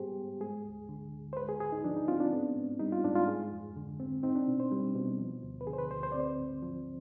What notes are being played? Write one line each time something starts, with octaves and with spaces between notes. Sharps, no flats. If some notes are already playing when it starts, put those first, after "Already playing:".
Already playing: G#2 G3 B3 G4 G#4 C5
G#2
G#3 G#4
D2
D3
D2
C5
G#3 B4
G#4
G#2 G#4
D#4
F3 D4
D#4
C4 F4
D4
B3
G#2
G3 D#4
F4
G#2 D4
F4
G#3 G#4
F2
D3
C4
C4 D#4
D4
B2
C5
G3
B2
F3
D2
B4
D3 G#4
C5
B4
D2 C5
C5
C4 D5
C5
G#2
F3